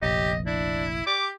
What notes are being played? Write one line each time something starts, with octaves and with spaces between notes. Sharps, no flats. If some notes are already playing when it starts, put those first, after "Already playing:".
F1 A#1 G4 D#5
D4 E4
G4 D6